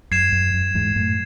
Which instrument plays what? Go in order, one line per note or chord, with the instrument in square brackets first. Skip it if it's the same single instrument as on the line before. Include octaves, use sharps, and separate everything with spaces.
[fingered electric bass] F#2 [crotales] G#6 C7 E7
[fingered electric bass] F#2
F#2
E2 G#2
F#2 A2